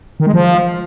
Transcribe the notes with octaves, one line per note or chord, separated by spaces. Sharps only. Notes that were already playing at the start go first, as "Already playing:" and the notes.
D#3
G#3
F3